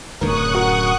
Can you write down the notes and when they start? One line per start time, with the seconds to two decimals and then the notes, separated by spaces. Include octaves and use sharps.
0.21 D1 F#2 C#3 A#4 C#6 D#6 F#6
0.55 F#4 A#4 F#5